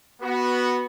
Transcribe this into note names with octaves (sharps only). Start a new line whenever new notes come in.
B3 F#4